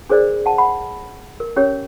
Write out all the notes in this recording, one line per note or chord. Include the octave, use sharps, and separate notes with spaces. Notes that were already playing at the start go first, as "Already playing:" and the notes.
D4 G#4 A#4 C5 D5 D#5
F#5 A5
F#5 B5
A#4
C#4 G4 A#4 C#5